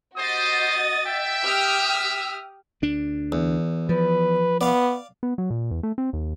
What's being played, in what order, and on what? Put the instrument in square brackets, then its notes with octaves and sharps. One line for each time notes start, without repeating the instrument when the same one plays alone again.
[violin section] F#4 D#5 A6 [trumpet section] G4 C5 [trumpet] D#6
[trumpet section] E5 [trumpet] G5
[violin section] G4 D#6 F6
[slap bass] D2 D4
[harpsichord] E2
[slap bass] F3 [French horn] B4
[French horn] B3 [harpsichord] D5 F5
[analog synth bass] B3
F#3
A#2
E2
A3
C4
D#2